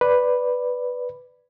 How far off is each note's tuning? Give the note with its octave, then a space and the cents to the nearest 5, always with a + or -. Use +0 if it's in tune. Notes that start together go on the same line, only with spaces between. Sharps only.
B4 +0 D5 +0